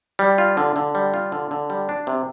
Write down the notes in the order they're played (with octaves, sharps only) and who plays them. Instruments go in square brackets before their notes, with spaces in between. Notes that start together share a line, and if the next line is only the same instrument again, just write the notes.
[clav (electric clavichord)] G3
F4
D3
D3
G3
F4
D3
D3
G3
D4
C3